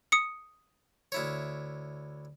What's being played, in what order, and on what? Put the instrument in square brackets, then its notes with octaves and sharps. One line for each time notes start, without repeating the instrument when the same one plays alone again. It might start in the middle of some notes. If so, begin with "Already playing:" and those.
[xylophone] D#6 C#7
[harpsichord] D2 E4 C#5